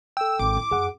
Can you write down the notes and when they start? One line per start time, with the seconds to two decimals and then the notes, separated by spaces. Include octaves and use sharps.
0.17 A4 G5 E6
0.39 G#1 D6
0.57 E4
0.71 F#2 G#4 F#5